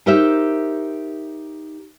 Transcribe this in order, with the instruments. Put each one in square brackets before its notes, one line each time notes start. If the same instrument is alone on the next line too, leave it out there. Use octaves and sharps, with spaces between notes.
[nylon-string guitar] D#4 G4 A#4 C5 E5